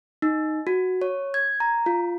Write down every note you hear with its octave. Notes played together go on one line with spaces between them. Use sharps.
D#4
F#4
C#5
G#6
A#5
F4